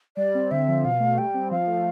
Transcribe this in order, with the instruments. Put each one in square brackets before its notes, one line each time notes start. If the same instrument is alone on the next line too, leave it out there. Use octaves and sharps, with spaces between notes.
[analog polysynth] G3 [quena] D5
[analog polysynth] C4
[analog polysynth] D3 [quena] E5
[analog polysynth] F3
[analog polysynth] B2 [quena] F5
[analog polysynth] A3
[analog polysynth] G3 [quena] G5
[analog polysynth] C4
[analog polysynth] F3 [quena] F5
[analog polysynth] A3